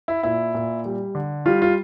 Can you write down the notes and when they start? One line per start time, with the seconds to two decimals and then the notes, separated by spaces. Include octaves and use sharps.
0.08 E4
0.23 A#2 E4
0.55 A#2
0.85 G3
1.15 D3
1.46 G3 F4
1.62 F4